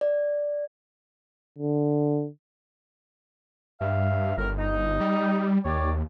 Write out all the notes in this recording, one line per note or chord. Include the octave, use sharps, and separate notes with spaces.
D5
D3
G2 E5 F5
G1 A2 A#4
D#4
G3
D#2 G4 C#5 D5